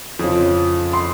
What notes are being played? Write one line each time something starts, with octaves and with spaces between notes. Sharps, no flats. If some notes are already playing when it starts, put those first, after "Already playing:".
F2 C#3 F3
C6